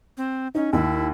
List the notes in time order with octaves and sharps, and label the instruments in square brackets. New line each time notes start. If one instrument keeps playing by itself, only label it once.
[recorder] C4
[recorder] C#4 [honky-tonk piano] D#4
[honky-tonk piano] D#2 [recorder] E4